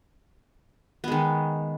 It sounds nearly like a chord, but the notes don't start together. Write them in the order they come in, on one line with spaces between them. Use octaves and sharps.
B3 G#3 D#3